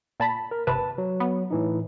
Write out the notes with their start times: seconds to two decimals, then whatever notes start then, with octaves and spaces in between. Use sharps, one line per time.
0.20 A#2 A5 B5
0.51 A#4
0.67 G1 C3 B4 A5
0.98 F#3
1.20 B3
1.51 A2 E3 D#4